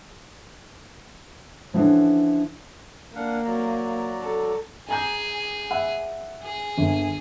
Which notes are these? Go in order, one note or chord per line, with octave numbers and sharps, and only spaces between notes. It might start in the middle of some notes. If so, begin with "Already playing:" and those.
D3 E3 F3 C#4
A#3 D4 F5 F#5
F#3 D5 A#5
A4
G#4 G#5 A#5 G6
E5 F#5 B5
G#4
G1